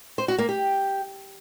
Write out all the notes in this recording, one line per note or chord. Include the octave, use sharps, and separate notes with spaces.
C5
F#4
A#3
G4